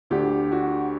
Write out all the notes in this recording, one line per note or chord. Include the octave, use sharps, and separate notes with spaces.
D2 D3 G4
F#4